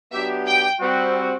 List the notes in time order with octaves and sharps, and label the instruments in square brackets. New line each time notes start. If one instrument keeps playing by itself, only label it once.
[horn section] F#3 B3 D4 G4 [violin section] E5
[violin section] G5
[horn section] G3 C4 F#4